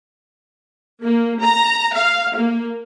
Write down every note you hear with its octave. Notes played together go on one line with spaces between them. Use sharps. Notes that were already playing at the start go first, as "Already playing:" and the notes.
A#3
A#5
F5
A#3